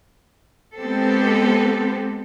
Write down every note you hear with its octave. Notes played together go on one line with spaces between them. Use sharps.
G#3 B3 C4 G4 A4